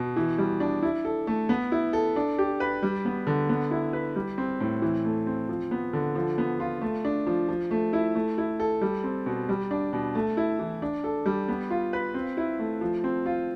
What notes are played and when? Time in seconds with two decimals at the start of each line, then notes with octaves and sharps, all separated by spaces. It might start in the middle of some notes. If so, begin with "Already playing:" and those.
Already playing: B2
0.16 E3
0.38 G3
0.60 D4
0.83 E4
1.05 A4
1.27 A3
1.49 B3
1.72 E4
1.93 A4
2.16 D4
2.38 G4
2.60 B4
2.83 G3
3.05 B3
3.27 D3
3.49 B3
3.71 E4
3.93 B4
4.16 G3
4.38 C4
4.60 A2
4.82 E3
5.05 A3
5.27 C4
5.49 F3
5.71 B3
5.93 D3
6.15 F3
6.38 B3
6.60 F4
6.81 A3
7.05 D4
7.27 F3
7.48 F3
7.71 A3
7.93 E4
8.15 A3
8.38 E4
8.60 A4
8.81 G3
9.04 C4
9.26 B2
9.49 G3
9.71 D4
9.93 B2
10.15 A3
10.37 E4
10.59 E3
10.82 D4
11.04 A4
11.26 G3
11.48 B3
11.70 F4
11.93 B4
12.14 C4
12.37 E4
12.59 A3
12.81 F3
13.04 C4
13.26 F4